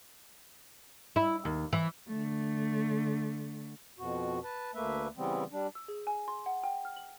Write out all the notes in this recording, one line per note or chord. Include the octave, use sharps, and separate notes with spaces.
E4
D#2
E3
D3 A3
F2 B2 F#4
B4 A5
D2 A3 A#3 B4 E5
C#3 E3 G3 B3 C4
G3 D4
E6
G#4
G#5
C6
F#5
G5
F6
F#7